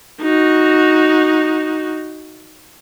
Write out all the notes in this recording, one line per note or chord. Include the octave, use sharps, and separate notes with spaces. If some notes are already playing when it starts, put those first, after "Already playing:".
D#4 F#4